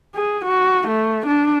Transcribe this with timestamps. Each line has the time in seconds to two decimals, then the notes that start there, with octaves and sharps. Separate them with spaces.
0.15 G#4
0.45 F#4
0.88 A3
1.27 D4